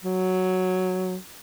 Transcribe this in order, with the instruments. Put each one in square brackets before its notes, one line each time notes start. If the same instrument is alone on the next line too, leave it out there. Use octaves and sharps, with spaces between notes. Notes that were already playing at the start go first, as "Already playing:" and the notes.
[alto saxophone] F#3